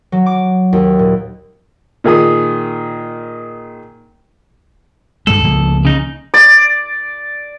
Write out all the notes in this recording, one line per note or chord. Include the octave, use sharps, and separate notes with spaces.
F#3
D6
D#2
A#2
A#2 D#3 G#4 D#6
G2 G3 G#3 A4
C#2 F3 A#3
C#3 D#4
D5